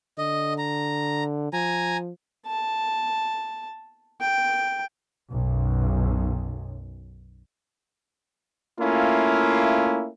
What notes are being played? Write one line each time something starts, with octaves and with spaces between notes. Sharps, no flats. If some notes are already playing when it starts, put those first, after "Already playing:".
D3 D#5
A#5
F3 G#5 A#5
A5
G5
B1 F#2
A3 A#3 C#4 E4 F4